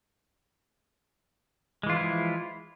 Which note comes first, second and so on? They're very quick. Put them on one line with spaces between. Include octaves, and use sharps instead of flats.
G#3 E3 F4 F3 E4